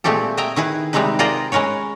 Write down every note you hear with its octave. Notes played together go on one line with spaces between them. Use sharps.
A#2 G#3 A3 C4 G4 A4
D#5 E5 G5 G#5 A#5
D#3 E4 G#4 B4
C3 G3 G#3 C4 D#4 B4
F4 G#4 A#4 C5 D5 D#5
G#3 C#4 A#4 B4 C#5